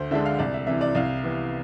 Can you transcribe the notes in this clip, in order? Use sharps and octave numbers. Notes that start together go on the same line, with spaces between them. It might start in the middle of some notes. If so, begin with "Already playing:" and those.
Already playing: D2 C5
D3 G#3 D4 E5
F5
C2 D5
E5
C3 E3 E5
D5
C2 F5
C3 E3 B3